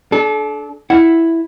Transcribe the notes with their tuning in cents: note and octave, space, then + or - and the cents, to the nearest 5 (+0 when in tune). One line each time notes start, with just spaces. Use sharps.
D4 +0 A4 -35
E4 +0 F#5 -5